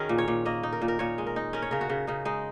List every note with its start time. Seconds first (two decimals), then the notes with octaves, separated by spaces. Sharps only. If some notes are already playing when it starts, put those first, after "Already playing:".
Already playing: D#3 C#4 F#4 G#4 A#4
0.09 A#2
0.18 C#5
0.28 A#2
0.45 A#3 D#5
0.63 D#4
0.73 A#4
0.81 A#2
0.88 A#4
0.99 A#2 C#5
1.18 G#3
1.27 A#4
1.36 D#4
1.53 C#4 A#4
1.62 C#5
1.71 C#3 A#4
1.81 F#4
1.90 C#3
2.07 C#3 D#4
2.25 G#3 D#4